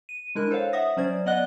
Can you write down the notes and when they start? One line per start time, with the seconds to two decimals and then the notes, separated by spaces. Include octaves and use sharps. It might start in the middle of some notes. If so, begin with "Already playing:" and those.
0.09 D#7
0.35 G#3 D4 E4 A#4 F#6
0.51 A4 C5 C#5 F5
0.73 E5 F#5 D#6 A#6
0.97 F#3 C#4 C5 D5 G#6
1.26 B3 D5 D#5 F#5 F#6 G7